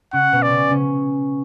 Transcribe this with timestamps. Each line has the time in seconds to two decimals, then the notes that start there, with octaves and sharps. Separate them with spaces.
0.13 C#3 C#4 F#5
0.32 B2 B3
0.42 D5
0.50 C#3 C#4
0.71 C#3 C#4